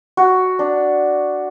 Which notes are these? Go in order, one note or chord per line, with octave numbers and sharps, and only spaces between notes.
F#4
D4